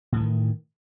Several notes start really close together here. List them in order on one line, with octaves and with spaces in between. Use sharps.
A2 E3 D#3